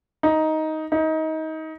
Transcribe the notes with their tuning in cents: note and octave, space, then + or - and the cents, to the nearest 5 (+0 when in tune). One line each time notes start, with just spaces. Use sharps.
D#4 +10
D#4 +25